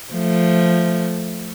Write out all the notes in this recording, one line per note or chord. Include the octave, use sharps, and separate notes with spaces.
F3 A3